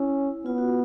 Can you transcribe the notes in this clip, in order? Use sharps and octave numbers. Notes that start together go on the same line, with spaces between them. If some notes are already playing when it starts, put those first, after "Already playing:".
Already playing: C#4 E4
B3 F4
F#4